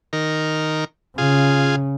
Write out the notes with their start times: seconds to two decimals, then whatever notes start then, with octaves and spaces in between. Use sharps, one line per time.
0.13 D#3 A#4
1.18 C#3 F4 G#4